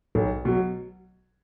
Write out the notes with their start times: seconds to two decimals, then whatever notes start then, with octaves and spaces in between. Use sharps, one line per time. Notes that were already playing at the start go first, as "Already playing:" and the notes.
0.15 B1
0.45 B2 F#3